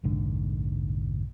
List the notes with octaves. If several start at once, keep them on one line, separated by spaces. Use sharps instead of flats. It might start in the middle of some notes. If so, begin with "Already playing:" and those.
F1 A#1 G#2 D3